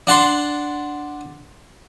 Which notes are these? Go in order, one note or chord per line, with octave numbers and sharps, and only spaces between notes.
D4 F#5 A5 C6